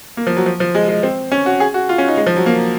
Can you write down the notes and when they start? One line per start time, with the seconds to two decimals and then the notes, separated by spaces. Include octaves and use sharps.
0.17 A#3
0.27 F3
0.37 F#3
0.46 F3
0.60 F3
0.75 G#3
0.89 G#3
1.03 C4
1.32 C#4
1.46 F#4
1.60 G#4
1.74 F#4
1.89 F4
1.98 C#4
2.08 D#4
2.17 G#3
2.27 F3
2.36 F#3
2.46 A#3